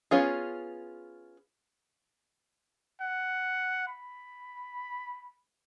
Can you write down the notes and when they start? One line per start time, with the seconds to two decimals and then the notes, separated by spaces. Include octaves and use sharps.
0.11 B3 C#4 F4 G#4
3.01 F#5
3.88 B5